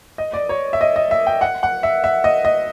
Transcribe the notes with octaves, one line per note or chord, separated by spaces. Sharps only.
D#5
D5
C#5
E5
D#5
D#5
E5
G5
F#5
F#5
E5
E5
D#5
D#5